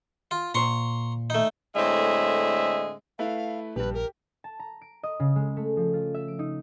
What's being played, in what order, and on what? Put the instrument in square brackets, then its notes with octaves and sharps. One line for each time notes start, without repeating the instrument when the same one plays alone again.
[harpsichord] F4
[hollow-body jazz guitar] A#2 C5 [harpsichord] A#5 C6 C#6
[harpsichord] A3 D#4
[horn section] A2 D3 G#3 C4 E5
[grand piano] A3 E4 B4 [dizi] F5
[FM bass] A#1 [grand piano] G2 G4 [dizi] B4
[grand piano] G4 [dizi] A#4
[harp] A5
A#5
D7
D#5
C#3
G#3
A3
F3
F4
E5
D7
D#4